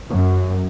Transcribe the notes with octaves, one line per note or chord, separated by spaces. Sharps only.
F#2